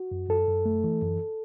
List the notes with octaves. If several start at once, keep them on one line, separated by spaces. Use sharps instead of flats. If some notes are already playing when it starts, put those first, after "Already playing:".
Already playing: F#4
F#2
F#2 A4
F#2
A3
E3
F#2